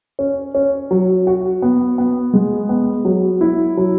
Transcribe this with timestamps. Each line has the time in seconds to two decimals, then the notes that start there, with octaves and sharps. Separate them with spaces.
0.19 C#4
0.55 C#4
0.91 F#3
1.27 F#4
1.62 B3
1.98 B3
2.33 G#3
2.69 B3
3.05 F#3
3.41 E4
3.77 F#3